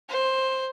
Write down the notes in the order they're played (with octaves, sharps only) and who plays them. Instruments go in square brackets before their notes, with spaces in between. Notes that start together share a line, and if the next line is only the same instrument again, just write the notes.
[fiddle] C5